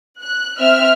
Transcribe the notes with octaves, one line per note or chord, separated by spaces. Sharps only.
F#6
C4 E5 F6